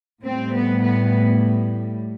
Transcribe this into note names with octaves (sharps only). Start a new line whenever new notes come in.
A2 G3 C4
B3
B3